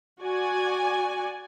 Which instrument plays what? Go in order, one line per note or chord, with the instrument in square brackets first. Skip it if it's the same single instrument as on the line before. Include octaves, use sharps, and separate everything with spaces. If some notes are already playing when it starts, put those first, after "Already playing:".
[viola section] F#4 D5 G#5